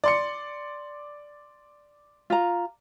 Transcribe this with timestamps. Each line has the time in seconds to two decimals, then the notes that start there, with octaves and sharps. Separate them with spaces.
0.04 D5 C6 C#7
2.30 F4 A#5